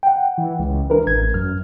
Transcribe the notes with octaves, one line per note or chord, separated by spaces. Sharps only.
F#5 G5
E3
C#2
E3 D4 A#4 B4
A1 G#6
F#2 F6